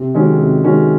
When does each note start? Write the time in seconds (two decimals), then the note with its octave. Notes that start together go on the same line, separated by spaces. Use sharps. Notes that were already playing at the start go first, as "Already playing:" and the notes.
Already playing: C3
0.14 D#3 G#3 C#4 F#4
0.38 C3
0.63 D#3 G#3 C#4 F#4